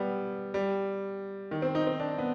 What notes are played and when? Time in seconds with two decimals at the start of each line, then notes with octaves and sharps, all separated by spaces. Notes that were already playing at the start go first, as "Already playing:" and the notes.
Already playing: G3 B3
0.54 G3
1.51 D#3
1.62 C4
1.75 D#4
1.87 C4
2.00 D4
2.18 B3